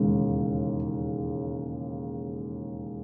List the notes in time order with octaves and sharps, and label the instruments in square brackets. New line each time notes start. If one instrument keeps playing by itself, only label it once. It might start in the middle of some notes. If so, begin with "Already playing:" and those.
Already playing: [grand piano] E1 D#2 C#3